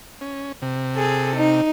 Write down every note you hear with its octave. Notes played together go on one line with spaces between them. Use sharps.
C#4
C3
G#4 A4
D#4